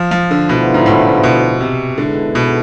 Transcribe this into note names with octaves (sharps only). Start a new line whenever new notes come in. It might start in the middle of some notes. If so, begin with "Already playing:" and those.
Already playing: F3
F3
D3
D2 B2 D3 F3 B3 E4
G#2
A2
B2
C3
G#2 D3 G#3 B3 E4 A4
B2